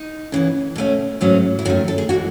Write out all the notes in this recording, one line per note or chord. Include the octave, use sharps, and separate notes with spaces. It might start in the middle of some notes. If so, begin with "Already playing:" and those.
Already playing: D#4
C#3 E3 B3
B2 A3 C#4
G#2 F#3 A3 C#4
E4
F#2 D#3 A3 F#4
A4
G#4
E3 G#3 F#4